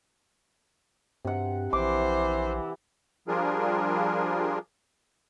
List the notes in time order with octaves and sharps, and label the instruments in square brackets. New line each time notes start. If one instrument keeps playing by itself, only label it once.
[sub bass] G2 [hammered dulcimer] C3 F#5
[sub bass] A#1 [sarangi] E3 [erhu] C5 [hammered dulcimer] D6
[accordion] F3 G3 D4 F4 G#4 A#4